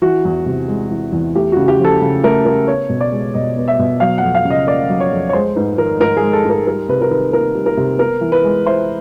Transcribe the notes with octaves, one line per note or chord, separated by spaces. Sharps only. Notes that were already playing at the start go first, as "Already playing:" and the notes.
E3 F#4
E2
C3
G#3
E3
E2
A3 G4
C#3 F#4
G4
F3
A4
C#3
A3 A#4
C#3 A#4
B3 C#5
B2
D5
G#3
B2 D#5
B3
E5
B2
F#3 F5
F2 F#5
F5
C#3
D#5
A#3 D5
F#3
C#5
F2
C#5
G#3 C5
G#2 B4
D#3 A#4
G#2 A#4
G#3 G#4
A4
G#2 A#4
G3 A#4
C3 B4
A#4
D#3 B4
A#3 A#4
G3
A#4
C3
B3 A#4
E3
B4
G#3
E4 C5